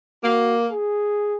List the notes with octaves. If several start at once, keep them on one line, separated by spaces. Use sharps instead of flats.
A#3 F#4
G#4